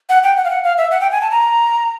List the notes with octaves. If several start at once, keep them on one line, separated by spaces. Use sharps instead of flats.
F#5
G5
F#5
F5
F#5
F5
E5
F#5
G5
G#5
A5
A#5